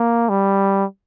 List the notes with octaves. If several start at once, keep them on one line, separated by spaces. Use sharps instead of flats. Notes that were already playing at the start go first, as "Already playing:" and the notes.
Already playing: A#3
G3